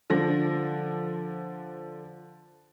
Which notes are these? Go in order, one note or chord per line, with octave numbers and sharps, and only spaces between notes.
D3 F3 A#6